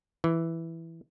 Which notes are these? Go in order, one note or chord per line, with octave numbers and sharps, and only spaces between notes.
E3